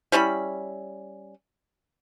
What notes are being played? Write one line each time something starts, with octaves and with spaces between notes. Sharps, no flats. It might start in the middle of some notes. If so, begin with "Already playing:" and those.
G3 C#4 E4 B5